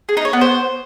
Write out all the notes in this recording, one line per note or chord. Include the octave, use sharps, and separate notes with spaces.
G#4
D#4
C#5
B3
C5